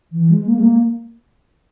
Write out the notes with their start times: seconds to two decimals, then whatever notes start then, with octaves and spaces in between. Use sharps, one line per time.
0.12 E3
0.30 G#3
0.46 A#3
0.56 G#3
0.62 A#3